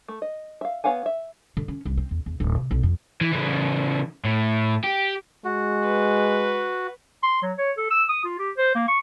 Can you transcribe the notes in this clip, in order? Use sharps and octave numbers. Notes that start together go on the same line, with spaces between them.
A3
D#5
E5 F5
B3 C#5 F5 F#5 G#5
E5
D3
C#4
C2
C4
E2
E2
D1
C3
B1
F2
E3
C#3 E3
A2
G4
G#3 F#4
B4
C6
F#3
C#5
A4
E6
D#6
F4
G4
C5
A#3
C#6